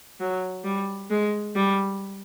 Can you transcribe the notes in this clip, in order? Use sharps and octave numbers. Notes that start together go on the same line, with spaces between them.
F#3
G3
G#3
G3